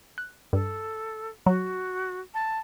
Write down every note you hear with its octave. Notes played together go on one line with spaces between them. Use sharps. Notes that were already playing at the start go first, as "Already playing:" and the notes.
F#6
G2 A4
F#3 F#4
A5